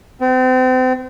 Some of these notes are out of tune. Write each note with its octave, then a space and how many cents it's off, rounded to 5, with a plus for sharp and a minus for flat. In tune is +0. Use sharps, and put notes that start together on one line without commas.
C4 -35